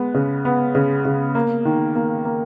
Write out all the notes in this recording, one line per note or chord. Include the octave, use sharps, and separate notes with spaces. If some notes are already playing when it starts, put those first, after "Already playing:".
Already playing: G#3 B3
C#3
B3
C#3
C#3
A#3
D#3
A#3
A#3